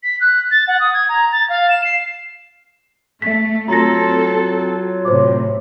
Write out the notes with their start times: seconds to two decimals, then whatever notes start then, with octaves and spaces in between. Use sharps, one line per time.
0.03 B6
0.21 F#6
0.51 A6
0.68 F#5
0.80 D#6
0.94 G#6
1.09 A#5
1.32 A6
1.50 F5
1.70 E7
1.85 C7
3.22 A3 E5 B6
3.68 F#3 C4 F4 A4 A#5 A#6
5.05 A2 C3 C5 C#5 D6